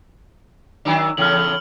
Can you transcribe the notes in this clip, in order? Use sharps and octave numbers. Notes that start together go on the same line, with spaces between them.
D#3 F#3 D4
E2 A2 C#3 F6 F#7